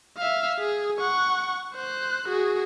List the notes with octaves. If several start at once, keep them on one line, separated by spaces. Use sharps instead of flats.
E5 F5
G#4
F#5 C#6
C5 F#6
F#4 G#4